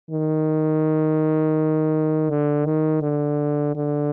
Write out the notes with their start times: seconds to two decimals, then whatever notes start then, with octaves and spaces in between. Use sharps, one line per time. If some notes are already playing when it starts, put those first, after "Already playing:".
0.11 D#3
2.30 D3
2.66 D#3
3.02 D3
3.76 D3